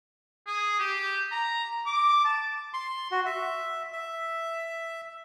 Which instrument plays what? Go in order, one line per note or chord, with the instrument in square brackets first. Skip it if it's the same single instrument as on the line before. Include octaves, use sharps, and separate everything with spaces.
[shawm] G#4
G4
A#5
D6
A5
[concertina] C6
F#4
E5
E5